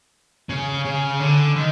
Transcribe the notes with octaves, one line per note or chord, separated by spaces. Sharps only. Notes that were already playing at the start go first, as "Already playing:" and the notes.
C#3
C#3
D3
D#3